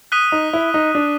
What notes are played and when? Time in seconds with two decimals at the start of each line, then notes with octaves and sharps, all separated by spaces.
0.12 D#6 F#6 B6 D#7 G7
0.32 D#4
0.53 E4
0.74 D#4
0.95 D4